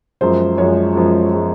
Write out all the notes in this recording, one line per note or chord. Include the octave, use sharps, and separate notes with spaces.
F#2 F3 G#3 C5
F#2 F3 G#3 C#5
F#2 F3 G#3
F3 G#3